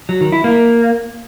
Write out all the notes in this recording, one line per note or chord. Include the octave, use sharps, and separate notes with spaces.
F#3
D#3
E4
A#3